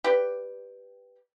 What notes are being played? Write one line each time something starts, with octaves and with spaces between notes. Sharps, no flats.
G4 B4 D5 G5